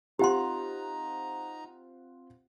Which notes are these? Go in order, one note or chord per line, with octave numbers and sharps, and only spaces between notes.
C4 D#4 F4 G4 F#5 A#5 C6